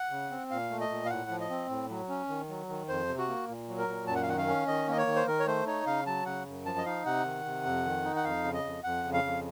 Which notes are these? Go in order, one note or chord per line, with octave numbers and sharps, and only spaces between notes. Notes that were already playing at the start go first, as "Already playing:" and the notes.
Already playing: F#5
C#3
C4
A#2 F5
A3
D#5
A#2
F5
A2 F#5
F3
D#5
C4
A2
F#3
C#4
D#3
F#3
D#3
F2 C5
C3
F#4
A#3
A#2
F#3
A#4
A#2
F#2 A5
F#5
F5
D#3 F#5
F5
C#4
D#3 D#5
A#3 D#5
C#5
D#3
C5
D#3 A#4
C#5
A3 C5
D#4 C#5
C#3 F5
F#3 A5
C#3 F#5
F#2
F3 A5
D#5
D#4 F5
C3 F#5
D#3
C3
F2
D#3
D#4
F#5
F2 F5
C#3
D#5
F2
F2 F#5
C#3
F5
F2